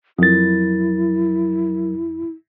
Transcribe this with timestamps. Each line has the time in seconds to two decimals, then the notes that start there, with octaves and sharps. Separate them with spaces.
0.19 F2 F#3 E4 A#4 A6